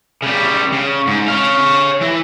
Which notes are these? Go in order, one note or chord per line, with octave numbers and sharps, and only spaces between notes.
C#3 G3
C#3
G#2
C#5 F5
E3